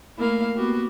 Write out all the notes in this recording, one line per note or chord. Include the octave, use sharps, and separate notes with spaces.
A3 A#3 E4 F5
A#3 B3 F#4 G4